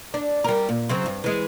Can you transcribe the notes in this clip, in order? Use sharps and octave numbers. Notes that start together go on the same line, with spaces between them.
D4
G3 A#4
A#2
C#3 F#3 C4
G2
E3 G#3